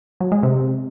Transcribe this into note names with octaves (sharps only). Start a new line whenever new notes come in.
F#3
G#3
C3